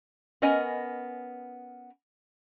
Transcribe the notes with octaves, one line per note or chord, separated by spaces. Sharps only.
B3 C#4 A#4 D#5 G#5